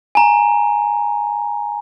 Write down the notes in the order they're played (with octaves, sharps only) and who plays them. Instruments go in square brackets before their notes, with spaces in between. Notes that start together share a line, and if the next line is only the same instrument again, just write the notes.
[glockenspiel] G#5 A#5